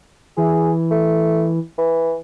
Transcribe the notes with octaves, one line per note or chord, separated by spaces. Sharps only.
E3 G#4
A3
E3